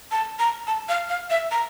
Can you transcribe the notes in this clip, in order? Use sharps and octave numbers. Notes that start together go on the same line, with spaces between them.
A5
A#5
A5
F5
F5
E5
A#5